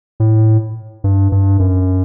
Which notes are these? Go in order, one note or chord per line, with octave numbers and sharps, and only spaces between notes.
A2
G2
G2
F#2